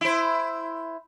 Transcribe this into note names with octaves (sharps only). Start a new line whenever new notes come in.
E4 C5